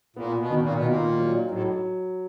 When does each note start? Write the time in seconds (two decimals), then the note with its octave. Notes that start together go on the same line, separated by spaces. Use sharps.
0.16 A#2 B3
0.39 B2
0.50 D#3
0.62 A#2
0.74 B2
0.84 A#2 D#4
1.18 F#3
1.51 A2 F#3